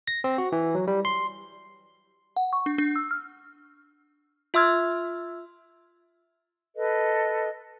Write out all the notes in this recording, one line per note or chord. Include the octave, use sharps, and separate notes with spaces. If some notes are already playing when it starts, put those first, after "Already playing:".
A#6
C4
F#4
E3
F#3
G3
C6
F#5
C#6
D4
D4
E6
F6
F4 E5 C6 E6 F6 G#6
A4 B4 D#5